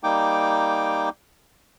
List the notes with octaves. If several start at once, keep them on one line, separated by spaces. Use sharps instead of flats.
G3 A#3 D#4 G5 D6